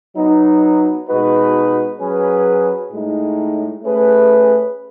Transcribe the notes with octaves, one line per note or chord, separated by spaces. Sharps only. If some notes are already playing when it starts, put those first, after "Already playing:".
F#3 B3 D#4
B2 G#3 D#4 F#4 B4
F#3 C#4 G#4 B4
A2 G#3 D#4
A3 C#4 G#4 B4